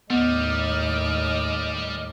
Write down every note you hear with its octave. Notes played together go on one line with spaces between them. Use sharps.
D#2 A2 G3 B3 D#5 D6 F6